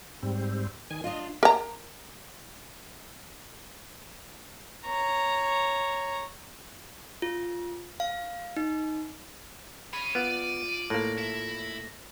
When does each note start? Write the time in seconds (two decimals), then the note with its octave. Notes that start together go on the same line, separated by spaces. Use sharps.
0.23 G#2 G3 C4
0.91 D#3 G#5
1.04 D4 F4 D#5
1.43 A#4 A#5
4.86 C#5 A#5
7.22 F4
8.00 F5
8.57 D#4
9.93 C#5 F5 B5 D#7
10.15 B3 F4 D5
10.90 A2 A#3 A#6
11.18 E4 E5